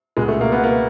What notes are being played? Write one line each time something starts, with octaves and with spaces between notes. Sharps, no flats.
C#2 B2 G#3
A3
A#3
B3
A#3